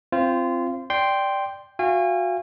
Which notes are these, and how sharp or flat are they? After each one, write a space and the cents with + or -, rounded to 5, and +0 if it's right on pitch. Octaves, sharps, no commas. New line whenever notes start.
C4 +0 F4 -20 C5 +0
D5 +0 G5 +0 C6 +0
F#4 -25 F5 -30 G#5 -35